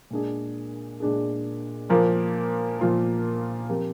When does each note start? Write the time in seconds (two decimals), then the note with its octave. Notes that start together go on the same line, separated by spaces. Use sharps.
0.10 A#2 G#3 D4 G#4
1.00 A#2 G#3 D4 G#4
1.89 A#2 F3 A#3 F4 A#4
2.79 A#2 F3 A#3 F4 A#4
3.69 F3 C4 G4 A#4